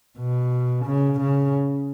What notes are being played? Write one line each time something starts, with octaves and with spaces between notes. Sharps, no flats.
B2
C#3
C#3